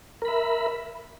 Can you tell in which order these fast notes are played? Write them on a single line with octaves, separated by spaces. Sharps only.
A#4 B5 E5